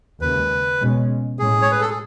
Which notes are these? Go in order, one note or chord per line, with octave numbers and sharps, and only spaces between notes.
D#2 C#3 G#3 B4
B2 G#3 C#4
A2 G#3 C#4 G#4
C#5
B4
A4
G#4